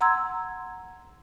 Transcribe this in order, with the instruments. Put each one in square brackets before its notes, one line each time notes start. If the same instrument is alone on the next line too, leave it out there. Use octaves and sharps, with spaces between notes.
[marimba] F#5 A#5 C6 E6 G#6